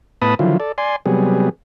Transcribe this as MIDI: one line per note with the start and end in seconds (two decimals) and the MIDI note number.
0.22 0.35 45
0.22 0.35 59
0.22 0.35 71
0.22 0.35 81
0.22 0.35 83
0.22 0.35 87
0.39 0.57 50
0.39 0.57 51
0.39 0.57 53
0.39 0.57 54
0.39 0.57 64
0.39 0.57 65
0.60 0.72 69
0.60 0.72 74
0.78 0.96 74
0.78 0.96 80
0.78 0.96 84
1.06 1.49 48
1.06 1.49 54
1.06 1.49 55
1.06 1.49 59
1.06 1.49 68